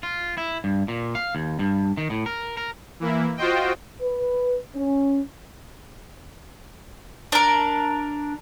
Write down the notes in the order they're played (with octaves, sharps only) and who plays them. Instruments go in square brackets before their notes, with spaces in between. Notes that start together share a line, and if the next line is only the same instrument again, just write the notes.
[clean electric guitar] F4
E4
G2
A#2
F5
D#2
G2
D#3
A2
A#4
A#4
[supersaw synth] E3 A#3 E4
F4 F#4 C5 D#5 G5
[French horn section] B4
C#4
[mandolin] D4 A#4